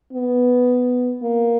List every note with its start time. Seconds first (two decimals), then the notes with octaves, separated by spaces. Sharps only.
0.13 B3
1.22 A#3